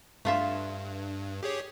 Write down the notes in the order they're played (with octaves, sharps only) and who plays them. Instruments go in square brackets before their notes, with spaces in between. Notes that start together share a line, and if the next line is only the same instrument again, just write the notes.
[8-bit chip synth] G2 [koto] A3 F4 E5
[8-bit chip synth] G4 G#4 C#5